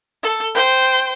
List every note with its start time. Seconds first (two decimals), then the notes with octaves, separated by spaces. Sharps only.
0.23 A4
0.55 C5 G5